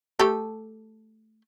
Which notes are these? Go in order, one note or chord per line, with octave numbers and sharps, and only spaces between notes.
A3 G4 A4